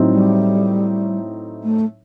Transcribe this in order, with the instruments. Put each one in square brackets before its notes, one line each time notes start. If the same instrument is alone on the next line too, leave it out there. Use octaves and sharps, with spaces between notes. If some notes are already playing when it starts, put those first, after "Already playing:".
Already playing: [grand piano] A2 F#3 C4 D#4
[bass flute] G3
A3